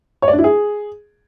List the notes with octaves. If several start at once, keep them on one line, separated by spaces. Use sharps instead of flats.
C#5
D5
D4
E4
G#4